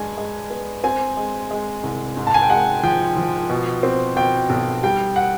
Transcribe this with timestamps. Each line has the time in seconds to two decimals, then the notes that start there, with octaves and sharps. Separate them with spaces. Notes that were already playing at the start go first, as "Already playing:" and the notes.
Already playing: G2 G#3 G#5
0.18 G#3
0.50 B3
0.84 C4 G#5
1.17 G#3
1.51 G#3
1.84 C2
2.17 G#2
2.27 A5
2.34 G#5
2.42 G5
2.50 G#3 F#5
2.83 F3 G5
3.17 F3
3.50 B2
3.83 C4
4.16 B2 G5
4.50 B1
4.83 G3 G5
5.16 F#5